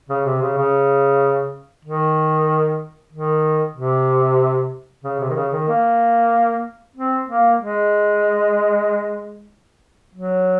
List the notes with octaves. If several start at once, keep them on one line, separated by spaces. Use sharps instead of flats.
C#3
C3
C#3
C#3
D#3
D#3
C3
C#3
C3
D#3
C#3
D#3
A#3
C4
A#3
G#3
F#3